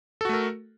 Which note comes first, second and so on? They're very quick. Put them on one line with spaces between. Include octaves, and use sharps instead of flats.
A4 F#4 A3 A#4